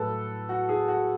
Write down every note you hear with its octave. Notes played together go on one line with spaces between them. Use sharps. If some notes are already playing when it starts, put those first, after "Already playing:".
Already playing: A2 F#3 A3 A4 B4
F#4
G#4
F#4